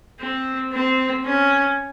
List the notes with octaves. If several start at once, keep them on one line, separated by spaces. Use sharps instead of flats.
C4
C4
C#4